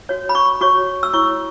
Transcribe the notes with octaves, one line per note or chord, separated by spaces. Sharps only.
F#4 C#5
B5
C#6
F#4 C#5 C#6
E6
E4 C#5 C#6